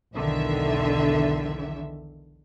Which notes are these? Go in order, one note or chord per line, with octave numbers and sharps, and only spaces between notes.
B1 E2 D3 D#3 E5